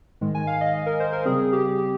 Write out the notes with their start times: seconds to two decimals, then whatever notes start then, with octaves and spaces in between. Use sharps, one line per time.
0.21 G#2 D#3 G#3
0.35 G#5
0.47 F5
0.61 D#5
0.86 A#4
1.00 C5
1.13 A#4
1.25 C#3 G3 C4 G#4
1.53 G4
1.78 G4